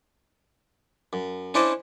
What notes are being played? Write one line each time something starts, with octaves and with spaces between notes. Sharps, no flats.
F#2
C#4 D4 E4 C5 D5 D#5